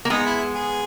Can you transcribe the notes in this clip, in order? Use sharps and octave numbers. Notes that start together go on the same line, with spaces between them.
A#3
G#3 B3 D#4
E4
G#4